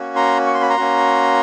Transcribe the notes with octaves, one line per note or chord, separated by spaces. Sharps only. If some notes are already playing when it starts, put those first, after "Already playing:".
Already playing: A#3 C#4 F#4
A#5 C6
C#6
C6
B5
A#5 C6
A#3 C#4 F#4